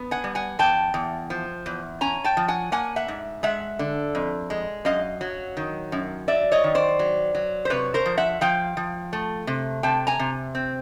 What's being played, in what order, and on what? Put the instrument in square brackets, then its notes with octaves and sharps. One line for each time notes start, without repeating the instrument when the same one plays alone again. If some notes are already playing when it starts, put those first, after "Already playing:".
Already playing: [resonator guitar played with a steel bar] B3
F#5 G#5
G3
F#5 G#5
E2 G5 A5
E2
F3
E2
C#4 G#5 A#5
G5 A5
F3
F#5 G#5
A#3 F#5 G#5
E5 F#5
G#2
G#3 E5 F#5
D3
F2
G#3
F#2 D#5 F5
F#3
D#3
F#2
F#3 D5 E5
C#5 D#5
D#3
C5 D5
F#3
F#3
C5
C3 B4 C#5
A#4 C5
F3
E5 F#5
F3 F5 G5
F3
A3
C3
C3 G5 A5
G#5 A#5
C3
C4